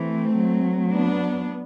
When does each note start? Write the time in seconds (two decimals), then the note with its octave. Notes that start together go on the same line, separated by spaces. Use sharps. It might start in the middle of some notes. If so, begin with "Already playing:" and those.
Already playing: E3 A3 C4
0.37 F#3
0.91 B3 D4